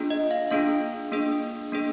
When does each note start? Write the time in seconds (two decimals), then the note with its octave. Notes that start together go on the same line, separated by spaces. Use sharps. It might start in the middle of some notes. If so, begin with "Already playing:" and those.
Already playing: A#3 D4 F4 G#4
0.10 D#5
0.31 F5
0.51 A#3 D4 F4 G#4 F5
1.11 A#3 D4 G#4
1.72 A#3 D4 G#4